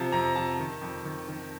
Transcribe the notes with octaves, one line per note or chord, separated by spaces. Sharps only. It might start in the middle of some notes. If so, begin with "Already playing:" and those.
Already playing: C3 F3 A5 A#5
F2 A#5
F3 A5
D#3
F2
D#3
D#3